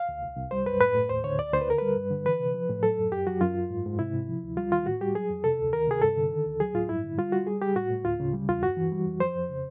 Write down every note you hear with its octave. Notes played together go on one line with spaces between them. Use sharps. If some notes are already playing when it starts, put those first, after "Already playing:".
Already playing: F5
D2
C2
C2
G3 C5
F#2 B4
A2 B4
A2
D#2 C5
D3 C#5
D2 D5
D2 C5
B4
D3 A#4
G3 B4
G2
D3
E3 B4
C3
F3
A2
F#3 A4
F#2
F#2 G4
F#3 F#4
F#2 F4
F#2
G#2
G#2
C3 E4
C3
F3
D2
G3 F4
D#3 F4
A2 F#4
G3 G4
F#3 G#4
F2
C3 A4
D2
D#3 A#4
C3 G#4
G2 A4
D3
D#3
D2
F#3 G#4
A2 F4
G2 E4
D3
G3 F4
G3 F#4
G3 G#4
G3 G4
A2 F#4
A2
D2 F4
C#3
G3
E2 F4
G2 F#4
E3
G3
F2
F3 C5
F2
C#3